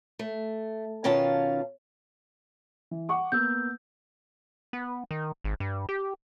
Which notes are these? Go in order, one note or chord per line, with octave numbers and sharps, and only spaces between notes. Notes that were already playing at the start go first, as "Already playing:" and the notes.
A3
B2 D#3 C#4 F4 F5 A5
E3
F#5 C#6 D6
A#3 B3 E6 G6
B3
D#3
G#1
G2
G4